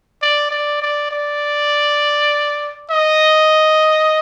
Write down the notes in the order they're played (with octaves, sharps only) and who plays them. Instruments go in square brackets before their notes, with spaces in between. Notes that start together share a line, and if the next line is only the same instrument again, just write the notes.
[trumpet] D5
D5
D5
D5
D#5